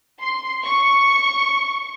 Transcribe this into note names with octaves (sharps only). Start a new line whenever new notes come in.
C6
C#6